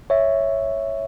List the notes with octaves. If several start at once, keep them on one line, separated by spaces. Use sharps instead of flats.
C#5 E5